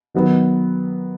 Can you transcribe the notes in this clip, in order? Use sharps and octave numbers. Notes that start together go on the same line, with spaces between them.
D#3 F#3 B3 D#4